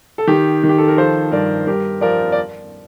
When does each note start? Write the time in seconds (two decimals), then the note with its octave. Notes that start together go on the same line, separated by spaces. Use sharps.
0.18 A4
0.27 D#3 G4
0.63 D#3
0.69 G4
0.78 A4
0.88 A#4
0.97 F3 A4 C5
1.32 G2 A#4 D5
1.67 G2 G4 A#4
2.01 F3 A#4 D5
2.32 D5